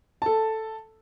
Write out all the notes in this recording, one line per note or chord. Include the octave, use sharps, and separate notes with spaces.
A4 A5